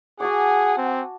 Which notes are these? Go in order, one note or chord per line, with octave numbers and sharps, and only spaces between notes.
F#4 G#4 F#5 G#5 A5 D6
C4